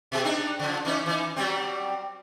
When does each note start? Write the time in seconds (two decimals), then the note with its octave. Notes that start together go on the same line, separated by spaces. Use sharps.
0.12 B2 G#4
0.24 C4 D4 D#4
0.59 C#3 F3
0.85 E3 C#4 D#4
1.06 E3 D#4
1.36 F#3 G3 C4